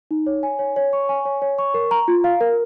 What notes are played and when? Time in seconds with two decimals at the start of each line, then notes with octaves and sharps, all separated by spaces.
0.11 D#4
0.26 C#5
0.43 G#5
0.59 C#5
0.76 C#5
0.93 C#6
1.09 G#5
1.25 C#5
1.42 C#5
1.58 C#6
1.74 A#4
1.91 A#5
2.08 F4
2.24 F5
2.41 A#4